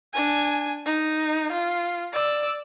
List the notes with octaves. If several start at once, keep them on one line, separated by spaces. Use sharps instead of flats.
D4 G#5
D#4
F4
D5 E6